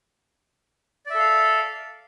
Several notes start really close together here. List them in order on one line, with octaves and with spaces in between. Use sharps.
D5 E5 A4 F5